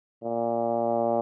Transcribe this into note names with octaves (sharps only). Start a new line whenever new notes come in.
A#2